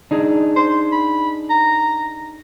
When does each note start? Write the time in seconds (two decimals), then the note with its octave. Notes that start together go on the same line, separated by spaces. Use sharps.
0.11 D4 D#4 G#4
0.56 C5
0.92 B5
1.50 A#5